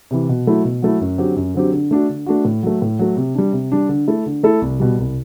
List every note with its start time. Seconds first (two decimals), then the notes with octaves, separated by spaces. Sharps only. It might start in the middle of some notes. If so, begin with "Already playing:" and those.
0.11 C3 E3
0.29 B2
0.47 F#3 A3 E4
0.65 B2
0.82 F#3 A3 E4
1.01 F#2
1.18 D3 F#3 C4 G4
1.36 F#2
1.54 D3 F#3 C4 G4
1.73 D3
1.91 A3 D4 F#4
2.09 D3
2.26 A3 D4 F#4
2.45 A2
2.63 F#3 A3
2.82 A2
2.99 F#3 A3
3.17 C3
3.35 G3 D4
3.53 C3
3.72 G3 D4
3.89 D3
4.07 A3 E4 A4
4.26 D3
4.43 A3 E4 A4
4.61 C2
4.80 B2 G3
4.98 C2